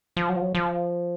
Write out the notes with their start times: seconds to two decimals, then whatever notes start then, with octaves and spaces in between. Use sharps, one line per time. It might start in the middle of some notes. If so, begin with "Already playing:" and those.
0.17 F3
0.29 F#3
0.36 F3
0.41 F#3
0.55 F3